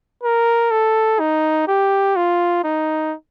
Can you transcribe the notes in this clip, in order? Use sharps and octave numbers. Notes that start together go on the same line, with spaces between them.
A#4
A4
D#4
G4
F4
D#4